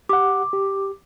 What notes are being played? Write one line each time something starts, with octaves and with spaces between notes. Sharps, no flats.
G4 F#5 D6
G4